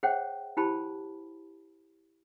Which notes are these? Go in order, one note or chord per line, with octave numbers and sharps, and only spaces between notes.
G#4 C5 C#5 E5 F#5 G5
E4 G4 C5 A5 B5